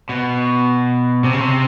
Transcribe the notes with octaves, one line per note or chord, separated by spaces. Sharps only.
B2
C3
C#3
C3